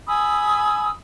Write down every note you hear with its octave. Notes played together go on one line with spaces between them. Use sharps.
G#5 B5 D#6 E6